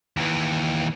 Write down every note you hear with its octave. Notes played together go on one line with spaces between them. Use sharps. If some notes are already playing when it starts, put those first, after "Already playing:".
D#2 E3